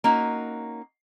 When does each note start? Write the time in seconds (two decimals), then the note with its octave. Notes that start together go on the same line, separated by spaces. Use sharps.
0.04 A#3 C#4 D#4 F#4